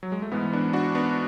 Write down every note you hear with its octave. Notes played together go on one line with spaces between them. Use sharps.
F#3
G#3
A3
G#2 E3 G#3 B3
B3 D4
D4 F#4
B3 D4